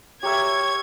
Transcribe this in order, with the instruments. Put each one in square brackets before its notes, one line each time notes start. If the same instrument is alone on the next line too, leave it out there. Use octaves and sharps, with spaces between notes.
[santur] G4 A#4 E5 [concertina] C#5 [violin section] G#6